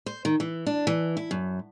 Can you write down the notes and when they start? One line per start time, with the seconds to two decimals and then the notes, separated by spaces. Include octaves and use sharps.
0.06 C5
0.25 D#3
0.40 E3
0.66 D4
0.87 E3
1.17 E4
1.31 F#2